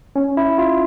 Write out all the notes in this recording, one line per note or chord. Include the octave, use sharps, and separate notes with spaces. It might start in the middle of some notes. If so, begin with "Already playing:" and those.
C#4
E4
F4